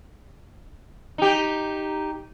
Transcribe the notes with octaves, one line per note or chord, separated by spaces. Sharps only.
D#4 G4